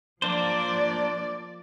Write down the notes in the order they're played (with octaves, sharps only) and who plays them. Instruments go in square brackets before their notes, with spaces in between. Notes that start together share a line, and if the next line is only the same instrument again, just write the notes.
[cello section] F3 D5 [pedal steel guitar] A#3 D4 C5